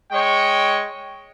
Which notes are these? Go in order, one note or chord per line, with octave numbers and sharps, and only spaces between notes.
G#3 C#5 G5 C#6